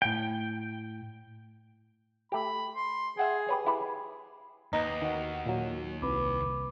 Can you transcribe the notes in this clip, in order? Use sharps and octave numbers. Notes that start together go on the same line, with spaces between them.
A2 G5 G6
A3 G4 B5
C6
G#4 E5 F#5 G5
G4 B4 C#5
E4 G4 B4
D#2 B3 D#4
D#3 F#4
A#2 F#3
C2 B4 B5 D6